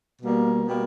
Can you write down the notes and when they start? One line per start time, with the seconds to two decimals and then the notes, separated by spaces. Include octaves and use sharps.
0.22 B2 G3 A#3
0.66 B2 G3 A#3